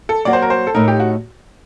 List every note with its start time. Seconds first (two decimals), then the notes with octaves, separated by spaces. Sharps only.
0.09 A4
0.25 F#3 A#3 F#4 D5
0.33 C5
0.42 A#4
0.50 C5
0.67 A4
0.75 A2 A3 D#4 A#4
0.88 G4
1.00 F#4